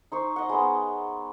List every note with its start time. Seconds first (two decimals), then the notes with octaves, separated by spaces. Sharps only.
0.12 D#4 C5 C#6
0.36 D#5 F#5
0.49 G#3 B3 A#4